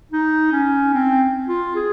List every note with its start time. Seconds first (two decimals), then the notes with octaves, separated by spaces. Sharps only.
0.12 D#4
0.52 C#4
0.93 C4
1.48 F4
1.75 G#4